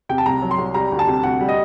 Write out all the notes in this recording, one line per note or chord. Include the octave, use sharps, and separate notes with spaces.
C3 G5
A5
C2 A#5
F#3
C6
C2
G3 A#5
D2
A5
C3
D2 F#5
G3
D#5